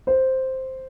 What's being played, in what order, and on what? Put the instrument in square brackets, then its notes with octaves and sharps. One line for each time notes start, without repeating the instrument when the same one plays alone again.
[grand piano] C5